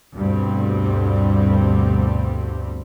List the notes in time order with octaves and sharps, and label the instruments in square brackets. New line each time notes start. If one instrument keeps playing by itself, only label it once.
[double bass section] D2 G2 B2 G3 C4